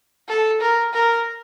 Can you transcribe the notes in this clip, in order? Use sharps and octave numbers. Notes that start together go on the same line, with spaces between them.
A4
A#4
A#4